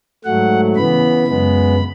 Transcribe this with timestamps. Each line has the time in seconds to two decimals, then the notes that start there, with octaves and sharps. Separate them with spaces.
0.24 G#2 F#3 A3 F#5
0.76 C#3 E3 B3 B5
1.27 F#2 C#3 G#3 B3